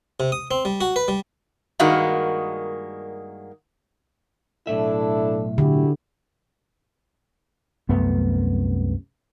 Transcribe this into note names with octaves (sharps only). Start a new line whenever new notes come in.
C3
D#6
C4
G3
F#4
B4
G3
G2 D#3 G#3 A#3 F#4
B1 A2 D4 E4 A4 E5
D3 E4 F#4 G4
C2 F#2 A3 B3